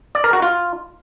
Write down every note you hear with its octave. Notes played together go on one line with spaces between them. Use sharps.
D5
A#4
F#4
F4